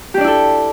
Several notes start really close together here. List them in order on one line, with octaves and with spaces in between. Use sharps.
G4 D4 D5 E4 A4